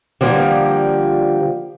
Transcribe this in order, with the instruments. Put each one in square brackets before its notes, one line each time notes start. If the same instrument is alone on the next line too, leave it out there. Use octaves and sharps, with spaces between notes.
[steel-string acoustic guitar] D3 F3 G3 A#3